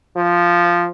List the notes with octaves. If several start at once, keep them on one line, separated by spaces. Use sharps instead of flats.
F3